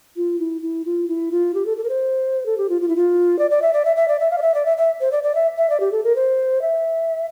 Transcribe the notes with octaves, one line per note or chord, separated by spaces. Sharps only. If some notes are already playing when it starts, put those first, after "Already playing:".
F4
E4
E4
F4
E4
F4
G4
A4
A4
A#4
C5
A4
G4
F4
F4
E4
F4
D5
D5
E5
D5
E5
E5
D5
E5
F5
D5
E5
D5
E5
E5
C5
D5
D5
E5
E5
D5
G4
A4
A#4
C5
E5